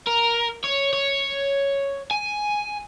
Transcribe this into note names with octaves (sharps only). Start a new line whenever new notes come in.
A#4
C#5
C#5
G#5